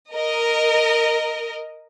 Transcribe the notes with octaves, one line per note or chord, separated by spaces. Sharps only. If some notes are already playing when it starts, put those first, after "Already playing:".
A#4 D#5